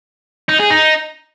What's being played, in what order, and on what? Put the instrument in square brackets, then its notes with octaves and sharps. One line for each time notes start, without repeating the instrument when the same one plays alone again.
[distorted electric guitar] D#4
G#4
D#4